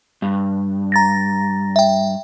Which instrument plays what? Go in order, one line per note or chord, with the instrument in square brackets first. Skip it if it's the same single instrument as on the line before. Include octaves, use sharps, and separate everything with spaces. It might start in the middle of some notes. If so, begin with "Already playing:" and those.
[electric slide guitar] G2
[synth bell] A#5 A6 A#6
E5 G5